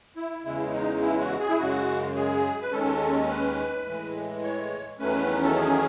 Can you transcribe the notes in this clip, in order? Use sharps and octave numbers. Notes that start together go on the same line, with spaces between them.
E4
E2 C#3 G#3 E4
D#4
E4
F#4
G#4
E4
F#2 C#3 G#3 F#4
G#4
B4
D#2 D#3 G#3 C#4 A4
B4
A2 E3 G#3
C#5
E2 D#3 F#3 A3 C#4 B4
A4
G#4